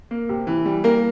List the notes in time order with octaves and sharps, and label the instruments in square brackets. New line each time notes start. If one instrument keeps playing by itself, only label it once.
[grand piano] A#3
C3
E3
G3
[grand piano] A#3 [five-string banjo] A#4